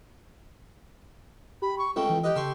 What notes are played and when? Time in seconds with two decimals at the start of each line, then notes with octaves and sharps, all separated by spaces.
1.62 G4 B5
1.78 C#6
1.96 C#2 C#3 A3 F4 G5
2.10 E3
2.24 G4 B4 D#5
2.36 C#3 A4 C6 C#6